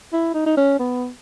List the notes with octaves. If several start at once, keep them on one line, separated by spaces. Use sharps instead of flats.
E4
D#4
D#4
C#4
B3